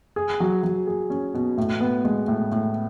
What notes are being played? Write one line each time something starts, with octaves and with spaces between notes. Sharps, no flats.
G#4
F#3
F#3
G#4
C#4
B2
A2
B3
G#3
A2
A2